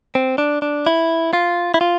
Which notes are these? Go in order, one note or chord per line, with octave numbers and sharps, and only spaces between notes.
C4
D4
D4
E4
F4
E4
F4